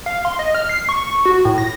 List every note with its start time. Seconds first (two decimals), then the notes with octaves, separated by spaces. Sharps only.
0.06 F5
0.25 C6
0.39 D#5
0.55 F6
0.69 C7
0.89 C#6
1.25 F#4
1.45 A2
1.58 A#6